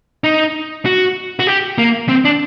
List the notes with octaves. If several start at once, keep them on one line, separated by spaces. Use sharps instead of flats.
D#4
F#4
F#4
G4
A#3
C4
D4